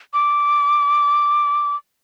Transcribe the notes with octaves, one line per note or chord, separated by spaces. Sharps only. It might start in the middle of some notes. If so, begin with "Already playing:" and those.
D6